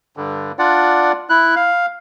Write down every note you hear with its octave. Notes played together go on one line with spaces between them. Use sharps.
G2 D3
D4 F4 D5 F#5
E4 F#6
F5